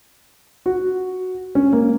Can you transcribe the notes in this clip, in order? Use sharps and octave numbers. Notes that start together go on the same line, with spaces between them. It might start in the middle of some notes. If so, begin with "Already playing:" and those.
F#4
C#4
A#3